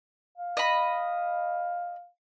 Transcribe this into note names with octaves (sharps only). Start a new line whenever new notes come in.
F5
D#5 B5